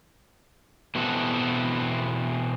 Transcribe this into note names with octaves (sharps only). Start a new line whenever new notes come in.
B2 E3 B3 C4 F#4 A4